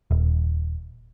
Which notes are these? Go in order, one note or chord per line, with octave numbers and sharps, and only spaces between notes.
D#1